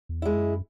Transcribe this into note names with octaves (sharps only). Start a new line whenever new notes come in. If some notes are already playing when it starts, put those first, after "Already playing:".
E2
G#3 E4
F#2